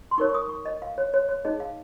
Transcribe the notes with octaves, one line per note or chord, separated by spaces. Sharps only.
C6
D#4 A#4 C#5 C#6
C#6
D#6
C#6
D#5
F5
C#5
C#5
C#5
D#4 G#4 C#5 D#5
F5